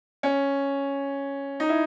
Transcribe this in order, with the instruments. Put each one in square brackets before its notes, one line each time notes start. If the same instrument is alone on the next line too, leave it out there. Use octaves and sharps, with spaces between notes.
[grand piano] C#4
D#4
E4